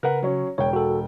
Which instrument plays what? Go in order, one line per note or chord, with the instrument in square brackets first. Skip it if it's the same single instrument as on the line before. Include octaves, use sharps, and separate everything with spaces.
[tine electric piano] C#3 [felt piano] A#4 B4 F#5
[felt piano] F#3 C#4
[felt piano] E1 G5 [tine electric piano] C#5
[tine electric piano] F#4 A4